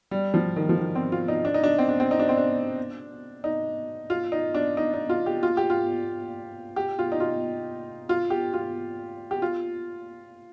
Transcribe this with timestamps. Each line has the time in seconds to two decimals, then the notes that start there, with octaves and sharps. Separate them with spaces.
0.11 G3
0.34 F3
0.56 D#3
0.69 F3
0.78 D#3
0.95 C4
1.12 F4
1.28 D#4
1.45 D4
1.54 D#4
1.64 D4
1.79 C4
1.89 D4
2.00 C4
2.11 D#4
2.19 D4
2.29 C4
2.37 D4
3.44 D#4
4.10 F4
4.32 D#4
4.55 D4
4.77 D#4
4.94 D#4
5.09 F4
5.26 G4
5.43 F4
5.57 G4
5.70 F4
6.76 G4
6.99 F4
7.12 D#4
7.20 F4
8.09 F4
8.30 G4
8.54 F4
9.31 G4
9.42 F4